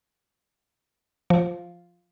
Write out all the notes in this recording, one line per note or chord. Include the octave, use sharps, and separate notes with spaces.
F3